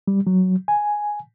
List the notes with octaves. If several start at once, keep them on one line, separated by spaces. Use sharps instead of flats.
G3
F#3
G#5